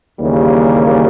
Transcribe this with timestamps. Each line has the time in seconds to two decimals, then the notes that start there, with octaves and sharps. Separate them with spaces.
0.20 D#2 C#3 E3 G3 A#3